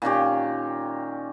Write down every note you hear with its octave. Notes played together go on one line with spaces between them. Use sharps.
A#2 D#3 C#4 G4